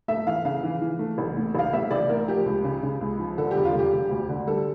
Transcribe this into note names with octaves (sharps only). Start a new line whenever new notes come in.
A3 E5
E3 F5
C#3 F5
E3
E3
A3
A1
A2
A1 F5
A1 E5
A1 D5
A2 A#4
F3 G4
C#2
C#3
C#3
C#2
F3
D3 A4
E1 G4
F4
E1 G4
E1
D2
D3
G3 A4